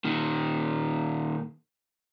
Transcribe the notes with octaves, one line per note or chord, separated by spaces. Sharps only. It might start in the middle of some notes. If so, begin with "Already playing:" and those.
A#2 D#3